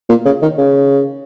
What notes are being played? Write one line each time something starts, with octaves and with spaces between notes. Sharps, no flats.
A#2
C#3
D#3
C#3